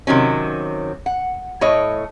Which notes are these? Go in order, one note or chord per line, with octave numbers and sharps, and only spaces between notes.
C3 D#3 F#3 C#4
F#5
A2 A3 C#5 D#5